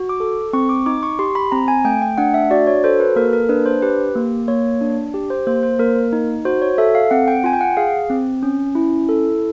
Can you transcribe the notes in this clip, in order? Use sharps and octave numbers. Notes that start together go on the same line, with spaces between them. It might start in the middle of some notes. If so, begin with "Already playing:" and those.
Already playing: F#4
D6
A4
C4 C#6
D6
D#4 D6
C#6
G4 C6
B5
C4 A#5
G#5
A3 G5
G5
D4 F#5
E5
F#4 D5
C#5
A4 C5
B4
A#3 A#4
A#4
D4 B4
C5
G4 B4
A#3
A#3 C#5
D4
G4
C5
A#3 C5
C5
A#3 A#4
D#4
F#4 C5
C#5
A4 E5
F5
C4 F#5
G5
F4 G#5
G5
F#5
G#4 F5
C4
C#4
E4
A4